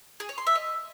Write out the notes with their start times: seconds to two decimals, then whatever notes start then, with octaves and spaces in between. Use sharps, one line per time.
0.20 G#4
0.29 C#5
0.38 C6
0.47 E5
0.55 D#5